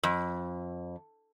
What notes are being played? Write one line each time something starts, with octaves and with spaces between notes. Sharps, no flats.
F2